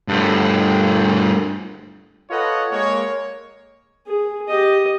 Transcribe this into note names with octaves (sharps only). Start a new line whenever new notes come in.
G2 A3
F4 A4 B4 C#5 D#5 F#5
G#3 A#3 C#5
G#4
G4 D#5